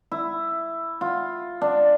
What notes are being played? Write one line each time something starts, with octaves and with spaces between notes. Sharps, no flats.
E4
F4
D4